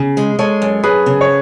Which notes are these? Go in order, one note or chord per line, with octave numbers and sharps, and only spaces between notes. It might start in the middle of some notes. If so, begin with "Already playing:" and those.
Already playing: C#3
G#3
G#3 A4 C#5
F#2
F#2 G#4 B4
C#3
C#5